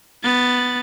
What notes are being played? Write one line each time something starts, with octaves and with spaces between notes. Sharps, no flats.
B3 A6